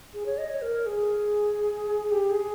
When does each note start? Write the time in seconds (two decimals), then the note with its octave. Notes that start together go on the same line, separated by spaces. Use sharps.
0.14 G#4
0.26 C#5
0.38 D#5
0.50 C#5
0.62 A#4
0.86 G#4
2.06 G#4
2.11 G4
2.30 G#4